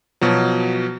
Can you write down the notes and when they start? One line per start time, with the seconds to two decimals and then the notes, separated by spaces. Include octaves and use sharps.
0.21 B2 F3 F#3